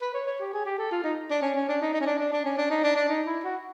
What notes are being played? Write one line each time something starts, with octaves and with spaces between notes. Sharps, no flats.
B4
C#5
C#5
G4
G#4
G4
A4
F4
D#4
D4
C#4
C#4
D4
D#4
D#4
C#4
D4
D4
D4
C#4
D4
D#4
D4
D4
D#4
E4
F#4